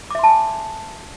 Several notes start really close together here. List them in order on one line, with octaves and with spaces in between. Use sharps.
D6 E5 C6 A5 G#5